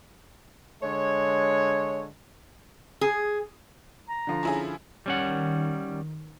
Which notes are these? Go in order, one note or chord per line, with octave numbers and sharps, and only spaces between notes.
D3 G#3 C#5
G#4
A#5
D3 F3
C#4 E4 G#4
D#3 G3 C#4 F#5